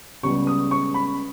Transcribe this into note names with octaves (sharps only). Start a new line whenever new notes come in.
C#2 C#3 G3 B3 C#6
D#6
C#6
B5